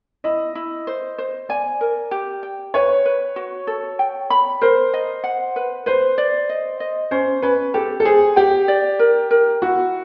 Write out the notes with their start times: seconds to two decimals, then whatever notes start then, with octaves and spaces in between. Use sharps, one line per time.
0.24 E4 D#5
0.55 E4
0.87 C5
1.18 C5
1.49 D5 G#5
1.81 A#4
2.11 G4
2.43 G5
2.74 B4 C#5
3.06 B4
3.36 F#4
3.67 A4
3.99 G5
4.30 B5
4.61 A#4 C5
4.94 D#5
5.24 F#5
5.56 B4
5.86 B4 C5
6.18 D5
6.49 D#5
6.80 D#5
7.11 C#4 C5
7.42 C#4 B4
7.74 G4 A4
8.00 A4
8.05 G#4 C5
8.36 G4 G5
8.68 D5
8.99 A#4
9.31 A#4
9.62 E4 F#4